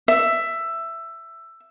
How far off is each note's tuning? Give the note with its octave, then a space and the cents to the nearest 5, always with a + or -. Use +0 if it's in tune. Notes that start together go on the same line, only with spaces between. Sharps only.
E5 +10